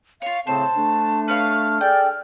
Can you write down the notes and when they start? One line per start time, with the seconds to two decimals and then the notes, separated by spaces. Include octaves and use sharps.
0.22 F4 C#5 F5
0.47 A2 C#3 C4 C5 A5
0.75 A3 D4
1.28 B4 C#5 F5 F6
1.81 G#4 A4 D5 G5